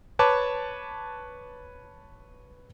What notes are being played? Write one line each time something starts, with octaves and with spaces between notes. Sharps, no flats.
B4 C#5 A5 D6